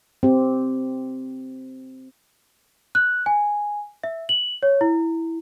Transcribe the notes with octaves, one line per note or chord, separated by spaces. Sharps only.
C4 G4
F#6
G#5
E5
F#7
C#5
E4